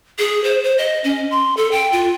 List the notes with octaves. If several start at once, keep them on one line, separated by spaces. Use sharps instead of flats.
G#4
C5
C5
D#5
C#4
C6
A4
G5
F4